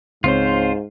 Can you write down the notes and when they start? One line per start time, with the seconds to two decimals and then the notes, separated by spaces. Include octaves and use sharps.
0.24 C#2 G#2 C4 F4 C5 C#5